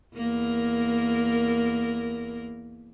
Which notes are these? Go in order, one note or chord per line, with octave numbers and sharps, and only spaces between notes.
E2 A#3 A#4